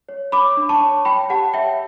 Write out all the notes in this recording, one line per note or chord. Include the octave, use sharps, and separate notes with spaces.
C#5
C#5 B5 D6
D4
A5 C#6
C#5
C#5 G5 B5
G4 F#5 A5
C#5 E5 G5